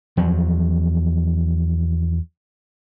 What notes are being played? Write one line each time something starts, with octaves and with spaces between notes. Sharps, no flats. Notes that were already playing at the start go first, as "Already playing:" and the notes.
E2 F3 F#3